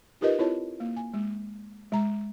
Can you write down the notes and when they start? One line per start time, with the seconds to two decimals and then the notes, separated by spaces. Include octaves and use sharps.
0.21 D#4 F4 G4 A#4 B4 D#5
0.38 C4 E4 F4 C#5 A5
0.80 A#3
0.96 G#5
1.14 G#3
1.92 G#3 A#5